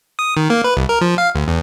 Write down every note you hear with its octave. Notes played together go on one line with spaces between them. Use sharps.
D#6
D#3
A#3
B4
C2
A#4
F3
F5
D2
E2